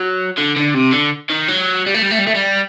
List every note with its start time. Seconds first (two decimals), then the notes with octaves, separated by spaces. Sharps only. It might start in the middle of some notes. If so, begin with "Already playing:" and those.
Already playing: F#3
0.38 D3
0.56 D3
0.74 C3
0.93 D3
1.30 D#3
1.49 F#3
1.86 G3
1.94 A3
2.03 G3
2.11 A3
2.19 G3
2.27 A3
2.35 G3